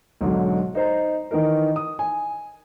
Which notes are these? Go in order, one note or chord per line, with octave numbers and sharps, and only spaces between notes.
B1 G#2 D3 F#3
D#4 C5 A#5
D#3 E3 D#4 A#4
D#6
G#5